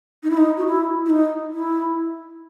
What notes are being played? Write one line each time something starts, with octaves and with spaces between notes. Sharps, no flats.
D#4
E4
D#4
F#4
E4
E4
D#4
E4